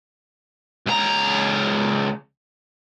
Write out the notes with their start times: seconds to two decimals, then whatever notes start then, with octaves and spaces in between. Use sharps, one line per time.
0.86 C#2 A#5